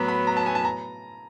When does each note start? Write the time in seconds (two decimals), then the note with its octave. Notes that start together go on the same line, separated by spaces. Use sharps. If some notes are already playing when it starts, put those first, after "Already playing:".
Already playing: A2 F#3 B3 A#5
0.08 B5
0.27 A#5
0.37 A5
0.46 G#5
0.55 A5
0.65 A#5